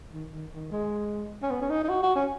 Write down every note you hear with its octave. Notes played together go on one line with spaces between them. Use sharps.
D#3
D#3
D#3
G#3
C#4
B3
C#4
D#4
D#4
F#4
F#4
C#4